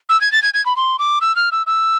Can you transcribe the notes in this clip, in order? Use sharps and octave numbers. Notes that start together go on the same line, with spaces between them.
E6
G#6
A6
G#6
G#6
B5
C6
D6
E6
F6
E6
E6